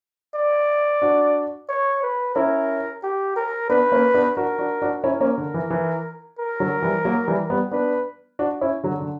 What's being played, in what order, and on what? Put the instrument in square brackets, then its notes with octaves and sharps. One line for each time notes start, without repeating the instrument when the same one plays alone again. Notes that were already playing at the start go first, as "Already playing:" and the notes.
[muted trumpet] D5
[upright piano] D4 F#4
[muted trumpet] C#5
B4
[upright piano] C#4 E4 [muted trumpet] A#4
[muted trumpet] G4
A#4
[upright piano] B3 D4 [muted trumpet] B4
[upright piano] A#3 C#4
B3 D4
[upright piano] D4 F#4 [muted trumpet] A#4
[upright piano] D4 F#4
D4 F#4
[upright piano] C#4 E4 [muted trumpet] A#4
[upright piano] A#3 C#4
D3
E3
E3
[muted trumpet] A#4
[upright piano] D3 F#3
E3 G3
F#3 A#3
E3 G3
G3 B3
[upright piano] B3 D4 [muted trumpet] B4
[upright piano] D4 F#4
C#4 E4
D3 F#3
D3